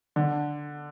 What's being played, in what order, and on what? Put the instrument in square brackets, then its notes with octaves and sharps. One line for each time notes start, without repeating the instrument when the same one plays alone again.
[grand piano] D3